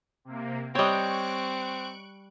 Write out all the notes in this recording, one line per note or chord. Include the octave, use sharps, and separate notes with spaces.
C3 A#3
G3 C4 C#5 D#5 G5 C#6 F#6 D7